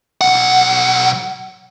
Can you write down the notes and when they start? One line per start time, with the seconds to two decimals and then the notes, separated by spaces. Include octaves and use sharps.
0.21 B1 F#5